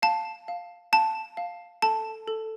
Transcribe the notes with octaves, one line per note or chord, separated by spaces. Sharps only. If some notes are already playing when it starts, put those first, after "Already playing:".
F5 A5
F5
F5 A5
F5
A4 A5
A4